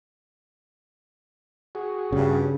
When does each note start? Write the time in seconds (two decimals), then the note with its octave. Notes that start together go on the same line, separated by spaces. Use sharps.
1.75 F#4 G#4
2.12 G2 C#3